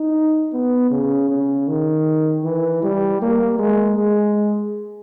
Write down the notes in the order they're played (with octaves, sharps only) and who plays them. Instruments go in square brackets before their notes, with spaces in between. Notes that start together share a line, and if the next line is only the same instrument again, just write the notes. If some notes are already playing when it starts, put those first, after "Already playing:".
Already playing: [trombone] D#4
B3
C#3
C#3
D#3
E3
G3
A#3
G#3
G#3